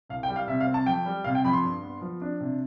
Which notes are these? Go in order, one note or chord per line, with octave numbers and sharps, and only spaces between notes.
C2 F5
G5
G3
F5
C3 E5
F5
C4
A5
F2 G5
G3
C3 F5
G5
F2 B5
C6
G2
B3
F3
D4
C3